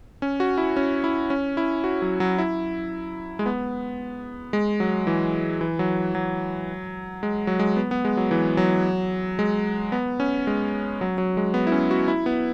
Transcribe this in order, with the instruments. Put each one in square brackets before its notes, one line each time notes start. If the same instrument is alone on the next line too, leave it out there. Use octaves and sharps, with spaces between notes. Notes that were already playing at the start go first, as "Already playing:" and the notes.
[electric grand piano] C#4
F#4
E4
C#4
E4
C#4
E4
F#4
F#3
F#3
E4
G#3
B3
G#3
F#3
E3
E3
F#3
F#3
G#3
F#3
G#3
B3
B3
G#3
F#3
E3
F#3
G#3
B3
C#4
G#3
F#3
F#3
G#3
B3
E4
C#4
F#4
E4
B3